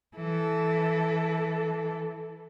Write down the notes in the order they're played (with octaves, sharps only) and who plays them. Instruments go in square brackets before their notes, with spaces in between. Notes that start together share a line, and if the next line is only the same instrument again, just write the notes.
[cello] E3 A4